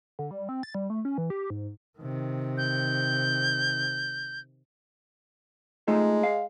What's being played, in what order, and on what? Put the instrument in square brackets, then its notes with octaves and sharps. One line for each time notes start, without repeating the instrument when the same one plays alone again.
[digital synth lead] D3
G3
C4
A6
G3
A3
C#4
E3
G4
G#2
[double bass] C3 D#3
[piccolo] G6
[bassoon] G#3 [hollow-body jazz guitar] A3 D#4 F4
[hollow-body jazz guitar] F5